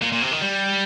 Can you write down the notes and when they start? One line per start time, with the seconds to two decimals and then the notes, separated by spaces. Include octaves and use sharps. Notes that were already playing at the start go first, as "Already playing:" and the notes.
0.02 A#2
0.13 A#2
0.22 C3
0.32 D#3
0.41 G3